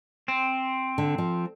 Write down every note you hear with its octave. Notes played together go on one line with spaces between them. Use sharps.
C4
D3
F3